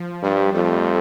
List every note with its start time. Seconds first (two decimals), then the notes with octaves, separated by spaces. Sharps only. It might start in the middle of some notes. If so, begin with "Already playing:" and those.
Already playing: F3
0.22 G2 G3
0.53 F2 A3